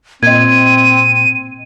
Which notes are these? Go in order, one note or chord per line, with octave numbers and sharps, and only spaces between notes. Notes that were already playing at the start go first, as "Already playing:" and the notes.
A#2 C4 D#5 G#6 D#7